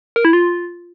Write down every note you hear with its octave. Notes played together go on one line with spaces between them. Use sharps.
A#4
E4
F4